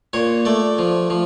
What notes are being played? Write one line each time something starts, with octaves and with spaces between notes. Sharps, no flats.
A#2 C#5
A3 D5
F3
F3